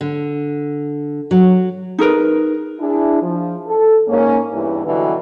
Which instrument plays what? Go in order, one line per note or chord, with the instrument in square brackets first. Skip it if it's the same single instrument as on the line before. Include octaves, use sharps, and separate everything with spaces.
[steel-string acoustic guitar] D3
F#3
[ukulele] D#4 G#4 A#4 B4
[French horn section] D4 E4 G#4
F3
A4
G#2 A#3 C#4
E2 G2 E3
G2 B2 D3 E3 F#3 G3